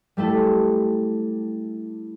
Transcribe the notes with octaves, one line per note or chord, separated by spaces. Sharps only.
G3 A3 E4 A4